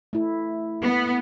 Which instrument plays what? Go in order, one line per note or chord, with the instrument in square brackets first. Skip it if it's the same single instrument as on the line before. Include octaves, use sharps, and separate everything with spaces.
[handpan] A3 E4
[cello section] B3